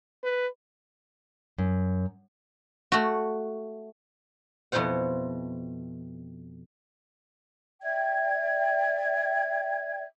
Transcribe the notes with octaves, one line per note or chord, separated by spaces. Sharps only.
B4
F#2
A3 F#4
F2 B2 E4 F4 C5 F#5
D5 E5 G5 G#6